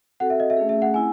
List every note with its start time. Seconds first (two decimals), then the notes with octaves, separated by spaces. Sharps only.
0.20 C4 F#4 A4 F#5
0.30 E5
0.40 D#5
0.50 E5
0.57 A3 C#4 G#4
0.69 E5
0.82 F#5
0.94 C4 E4 G#5